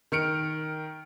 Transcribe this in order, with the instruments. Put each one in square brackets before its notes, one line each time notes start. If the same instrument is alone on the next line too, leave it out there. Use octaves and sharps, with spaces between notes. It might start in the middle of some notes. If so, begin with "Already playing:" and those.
[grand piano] D#3 F6 C#7 D7